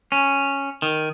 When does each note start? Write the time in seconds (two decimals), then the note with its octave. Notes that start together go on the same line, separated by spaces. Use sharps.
0.12 C#4
0.82 D#3